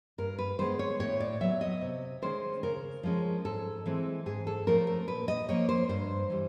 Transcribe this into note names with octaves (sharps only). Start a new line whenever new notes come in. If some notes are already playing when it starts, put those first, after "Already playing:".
G2 A#4
B4
D#3 G#3 B3 C5
C#5
A2 C#5
D5
F#3 B3 E5
D#5
C3
D#3 G#3 C#4 C5
C#3 A#4
F3 G#3 C#4
G#2 A4
E3 G#3 C4
G#2 G#4
A4
F3 A3 C#4 A#4
A#4
A#2 B4
D#5
F3 A#3 C#4 C#5
C5
G2 C5
E3 G3